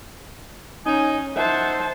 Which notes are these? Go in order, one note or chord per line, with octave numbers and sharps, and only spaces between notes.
C#4 D#4 G#5
D#4 C5 E5 F#5 A5